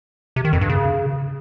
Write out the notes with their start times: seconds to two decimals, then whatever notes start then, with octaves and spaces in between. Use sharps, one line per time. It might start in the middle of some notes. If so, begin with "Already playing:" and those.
0.36 C3
0.45 D#3
0.53 F2
0.61 G2
0.70 C#3